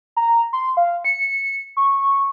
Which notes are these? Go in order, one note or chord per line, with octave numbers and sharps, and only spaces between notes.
A#5
C6
F5
C#7
C#6